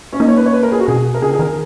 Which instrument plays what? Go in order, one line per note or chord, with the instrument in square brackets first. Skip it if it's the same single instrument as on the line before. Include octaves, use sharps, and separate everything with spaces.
[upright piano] C#4
[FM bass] A#3 [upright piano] D#4
[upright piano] C#5
B4
C#5
B4
A#4
G#4
F#4
[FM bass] B2 [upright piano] G#4
[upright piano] A#4
[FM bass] C#3 [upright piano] G#4
[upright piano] G#4
[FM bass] D#3 [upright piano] A#4